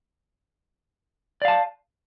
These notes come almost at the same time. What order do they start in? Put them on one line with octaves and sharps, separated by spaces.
D5 F5 A5